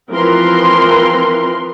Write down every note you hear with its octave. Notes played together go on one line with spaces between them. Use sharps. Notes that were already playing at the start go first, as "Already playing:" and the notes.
E3 F3 C4 A#4 B4 C6